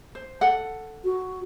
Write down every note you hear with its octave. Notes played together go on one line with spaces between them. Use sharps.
C5
A4 F#5
F#4